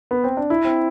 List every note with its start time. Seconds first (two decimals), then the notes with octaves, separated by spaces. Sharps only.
0.11 B3
0.24 C4
0.37 D4
0.50 E4
0.65 C4